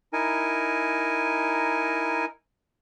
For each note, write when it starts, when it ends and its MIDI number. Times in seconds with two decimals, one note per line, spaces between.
0.13 2.25 63
0.13 2.25 64
0.13 2.25 70
0.13 2.25 80